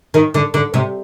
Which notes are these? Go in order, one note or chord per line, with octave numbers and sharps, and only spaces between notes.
D#3
D3
D3
C3